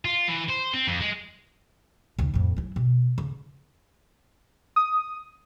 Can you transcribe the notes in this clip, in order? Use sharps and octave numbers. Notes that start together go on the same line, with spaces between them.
F4
E3
C5
C4
F2
G#3
D#2 C#3
F2 A2
F#3 E4
B2
C#3
D#6